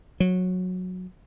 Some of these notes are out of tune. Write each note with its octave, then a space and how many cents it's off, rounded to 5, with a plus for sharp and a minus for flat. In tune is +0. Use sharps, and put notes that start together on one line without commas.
F#3 -15